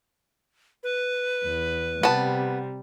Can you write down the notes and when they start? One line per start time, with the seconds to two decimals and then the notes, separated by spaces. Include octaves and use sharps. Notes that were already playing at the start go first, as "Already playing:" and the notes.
0.83 B4
1.44 E2
2.03 C3 G3 B3 A5